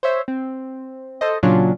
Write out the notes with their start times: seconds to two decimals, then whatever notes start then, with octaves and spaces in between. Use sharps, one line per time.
0.03 C5 C#5 E5
0.28 C4
1.21 A4 C5 D#5
1.43 A#2 C#3 F#3 C#4 D4 F4